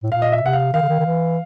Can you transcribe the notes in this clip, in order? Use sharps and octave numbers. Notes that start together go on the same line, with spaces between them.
A2
A#2 F5
D#5
E5
C3 F#5
F5
D#3 F5
D3
D#3
D#3
E3